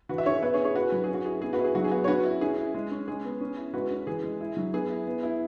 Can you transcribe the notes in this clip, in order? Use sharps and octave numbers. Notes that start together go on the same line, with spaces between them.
E3 F#4 B4
E5
C#4 G#4 C#5
B3 B4 E5
G#4 C#5
E4
G#4 C#5
E4 F#4 B4
F#3 B4
G#4
C#4 F#4
E4 G#4
B3 G#4
F#4 B4
E4
G#4
F#3 F#4
G#4
B3 F#4
C#5
C#4 F#4 B4
E4
C#4 G#4
E4
G#3
C#4
G#3 G#4
B3
C#4
E4
G#3 F#4 B4
C#4
E3 G#4
G#3
E4
F#3
B3 G#4
E4
B3
E4